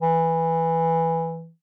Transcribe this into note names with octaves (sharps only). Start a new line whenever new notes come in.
E3